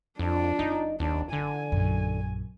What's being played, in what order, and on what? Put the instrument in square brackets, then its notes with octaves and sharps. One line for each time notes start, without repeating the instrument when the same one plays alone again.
[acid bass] F2 [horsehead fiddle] D4 F4
[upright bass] F#1 [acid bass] D#4
[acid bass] D#2 [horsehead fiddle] D4
[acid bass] D3 [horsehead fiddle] G#5
[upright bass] A#1 F#2